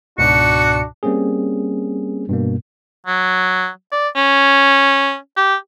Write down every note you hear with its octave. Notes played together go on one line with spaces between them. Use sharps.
C#2 G#2 B2 D4 F#4 C#7
G3 A#3 C4 C#4 G#4
G2 B2 A#3
F#3
D5
C#4
G4